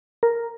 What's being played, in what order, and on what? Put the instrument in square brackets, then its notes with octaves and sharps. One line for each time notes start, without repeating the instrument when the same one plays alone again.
[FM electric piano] A#4